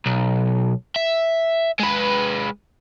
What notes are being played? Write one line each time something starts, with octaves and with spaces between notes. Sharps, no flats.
B1
E5
G#3 B4